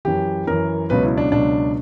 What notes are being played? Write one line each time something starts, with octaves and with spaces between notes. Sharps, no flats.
F#2 E3 G4
F#2 E3 A#4
C#2 B2 F#3 B4
E4
D4
C#2 B2 F#3 D4